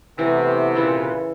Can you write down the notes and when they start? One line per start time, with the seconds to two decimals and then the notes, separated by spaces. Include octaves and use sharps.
0.19 C3 E3 A3 B3
0.75 A#2 C#3 E3 F4 A4 B4